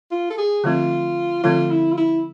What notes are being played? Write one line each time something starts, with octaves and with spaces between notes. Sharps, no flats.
F4
A4
G#4
D3 F3 A3 C4 F4
D3 F3 A3 C4 F4
E4
F4
E4